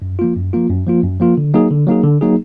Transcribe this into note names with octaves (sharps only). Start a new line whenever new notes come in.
F#2
F3 A#3 F4
F#2
F3 A#3 F4
F#2
F3 A#3 F4
F#2
F3 A#3 F4
D3
F#3 A#3 D#4 G#4
D3
F#3 A#3 D#4 G#4
D3
F#3 A#3 D#4 G#4